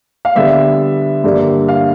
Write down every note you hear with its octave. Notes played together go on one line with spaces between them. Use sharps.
F5
D3 G3 B3 E5
G2 D3 G3 A#3
F5